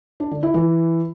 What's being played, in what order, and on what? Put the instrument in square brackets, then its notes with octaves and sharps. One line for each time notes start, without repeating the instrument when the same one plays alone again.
[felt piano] D4
D3
E4
E3